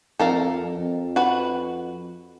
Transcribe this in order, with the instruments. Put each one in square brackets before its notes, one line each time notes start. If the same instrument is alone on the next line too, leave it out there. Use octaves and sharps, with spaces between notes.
[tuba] F2 [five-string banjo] A4 A#4 F5
[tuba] F2
[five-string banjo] F#4 B4